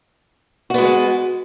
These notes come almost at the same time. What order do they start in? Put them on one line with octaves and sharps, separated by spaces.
F#4 B3 G#3